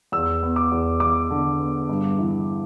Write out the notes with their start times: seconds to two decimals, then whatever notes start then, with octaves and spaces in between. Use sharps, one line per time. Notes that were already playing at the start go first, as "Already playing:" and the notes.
0.12 E2 E6
0.43 B3
0.56 D6
0.72 E2
1.00 E2 D6
1.31 D3
1.60 B3
1.89 G2
2.19 E3